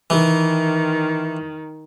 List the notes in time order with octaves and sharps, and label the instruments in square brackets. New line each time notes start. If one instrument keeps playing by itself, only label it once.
[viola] D#3 [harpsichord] E3